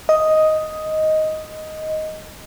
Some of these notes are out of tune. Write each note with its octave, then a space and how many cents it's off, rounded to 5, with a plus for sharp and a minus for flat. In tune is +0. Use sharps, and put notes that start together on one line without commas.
D#5 +5